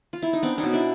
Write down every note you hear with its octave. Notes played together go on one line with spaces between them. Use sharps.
F4
E4
D#4
B3 C4 D4
C#4 D#4
B2
D4 E4